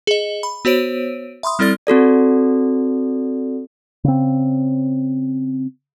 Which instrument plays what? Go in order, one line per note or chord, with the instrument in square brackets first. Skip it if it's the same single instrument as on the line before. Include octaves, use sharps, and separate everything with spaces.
[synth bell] G#4 D#5
B5
B3 F#4 C5 C#5 D7 D#7
E5 B5 C6 D#6
G3 C4 E4 A4 D5 A6
[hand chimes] C4 F#4 A4 D5
[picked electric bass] C#3 C4